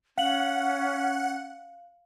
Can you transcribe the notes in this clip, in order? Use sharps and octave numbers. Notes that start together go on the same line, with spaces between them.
C#4 F5 F#5 F#7